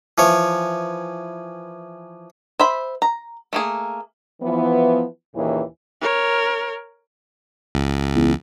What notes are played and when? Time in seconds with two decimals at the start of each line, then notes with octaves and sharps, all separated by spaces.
0.18 E3 F3 C#5
2.60 C5 E5 B5
3.02 A#5
3.53 A3 A#3 G#4
4.42 E3 F3 B3
5.35 D#2 A#2 C#3 E3
6.01 A#4 C#5
7.75 C#2
8.16 E2